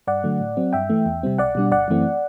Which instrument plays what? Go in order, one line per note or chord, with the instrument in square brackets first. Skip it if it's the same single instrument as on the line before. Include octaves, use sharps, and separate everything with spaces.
[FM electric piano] G2 D5 F#5
D3 F#3 A3
A2
F#3 C4
G2 E5 G5
E3 A3
E2
C3 G3 C4
B1 D5 F#5
B2 G3 D4
G1 D5 F#5
F#2 E3 A3 C4